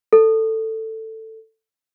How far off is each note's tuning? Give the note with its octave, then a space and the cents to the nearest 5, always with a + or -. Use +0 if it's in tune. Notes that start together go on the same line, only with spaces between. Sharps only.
A4 +10